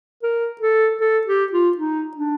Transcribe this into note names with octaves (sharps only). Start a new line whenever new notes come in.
A#4
A4
A4
G4
F4
D#4
D4